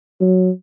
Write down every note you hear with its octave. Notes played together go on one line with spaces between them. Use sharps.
F#3